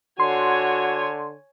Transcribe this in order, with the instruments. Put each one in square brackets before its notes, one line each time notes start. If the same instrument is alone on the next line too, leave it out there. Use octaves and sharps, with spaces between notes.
[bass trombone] D3 [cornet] F#4 [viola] C#5 G#5 [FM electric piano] C6